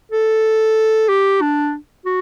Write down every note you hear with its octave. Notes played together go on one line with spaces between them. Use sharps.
A4
G4
D4
F#4